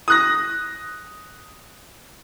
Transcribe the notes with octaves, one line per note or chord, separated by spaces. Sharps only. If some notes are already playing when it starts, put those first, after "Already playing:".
D#6 F#6 A#6